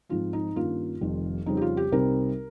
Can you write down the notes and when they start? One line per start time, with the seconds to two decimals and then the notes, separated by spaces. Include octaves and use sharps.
0.09 G#2 F3 C4 D#4 F4
0.33 D#4
0.56 G2 D#3 A#3 C#4 F4
1.01 F1 F2 D#3 G3
1.46 F2 C#3 G3 C4 D#4
1.57 G4
1.62 F4
1.77 G4
1.92 C2 C3 G3 C4 D#4 A#4